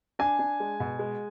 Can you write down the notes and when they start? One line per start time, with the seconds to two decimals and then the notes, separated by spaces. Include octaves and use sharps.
0.19 D4 G#5
0.39 D4
0.60 G#3
0.80 B2
0.99 G#3